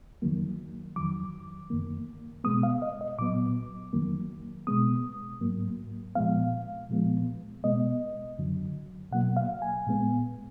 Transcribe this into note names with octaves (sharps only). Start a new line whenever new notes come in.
F2 D#3 F#3 A#3
F2 D#3 F#3 D6
F#2 D#3 A#3
B2 G#3 B3 D#6
F5
D#5
D#5
A#2 F#3 B3 D6
F2 D#3 F#3 A#3
B2 G#3 B3 D#6
G#2 F#3 A#3
A#2 F3 G#3 B3 F5
A#2 F3 G#3 B3
B2 G#3 B3 D#5
F#2 D3 F#3
B2 F#3 A#3 F#5
F5
G#5
A#2 G#3 B3